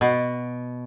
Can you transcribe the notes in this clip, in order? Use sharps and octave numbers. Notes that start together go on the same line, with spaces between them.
B2